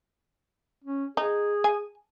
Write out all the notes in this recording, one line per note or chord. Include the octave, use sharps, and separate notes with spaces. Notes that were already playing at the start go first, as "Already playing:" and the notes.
C#4
D#4 G#4
G#5